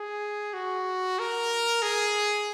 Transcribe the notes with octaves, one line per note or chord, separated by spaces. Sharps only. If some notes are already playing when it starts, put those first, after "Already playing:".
Already playing: G#4
F#4
A#4
G#4